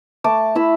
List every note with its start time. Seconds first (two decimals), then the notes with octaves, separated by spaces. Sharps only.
0.24 A3 A5 D6
0.55 E4 B5 E6